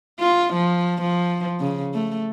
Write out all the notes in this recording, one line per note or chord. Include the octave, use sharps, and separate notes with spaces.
F4
F3
F3
C#3
A3